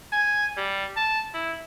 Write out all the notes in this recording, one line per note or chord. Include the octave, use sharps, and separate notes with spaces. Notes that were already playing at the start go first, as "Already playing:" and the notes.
G#5
G3
A5
E4